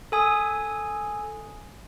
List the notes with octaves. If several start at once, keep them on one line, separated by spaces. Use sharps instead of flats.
A4 G#5 D#6